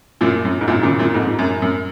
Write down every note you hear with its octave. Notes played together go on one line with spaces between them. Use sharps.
F#2 A#2
F#2
G#2
F#2 A#2
A#2 C#3
F#2 A#2
F2 G#2
F#2
F#2